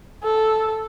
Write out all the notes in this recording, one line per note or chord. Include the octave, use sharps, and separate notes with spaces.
A4